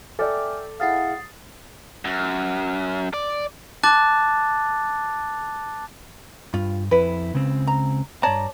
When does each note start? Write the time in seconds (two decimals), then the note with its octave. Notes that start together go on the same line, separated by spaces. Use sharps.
0.19 A4 D5 E5 G5 G#5 D6 F6
0.80 E4 G#4 F5 F#5 D#6 A6 C7
2.05 F#2
3.14 D5
3.83 A5 D6 F#6 A6
6.54 G2 F4
6.91 F2 E4 B4
7.34 C#2 C#3 C4
7.67 A#5
8.23 G2 C#5 D5 A5 A#5